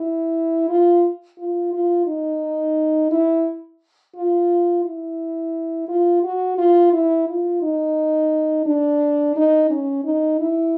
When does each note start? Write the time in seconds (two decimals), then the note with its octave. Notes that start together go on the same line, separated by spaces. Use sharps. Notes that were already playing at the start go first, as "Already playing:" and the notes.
Already playing: E4
0.69 F4
1.38 F4
1.73 F4
2.07 D#4
3.12 E4
4.16 F4
4.85 E4
5.88 F4
6.23 F#4
6.58 F4
6.93 E4
7.28 F4
7.62 D#4
8.66 D4
9.36 D#4
9.71 C#4
10.04 D#4
10.40 E4